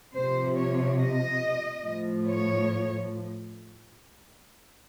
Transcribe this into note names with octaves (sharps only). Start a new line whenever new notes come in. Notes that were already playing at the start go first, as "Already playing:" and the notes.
C3 F3 C5
C#5
D#5
A2 F3
C#5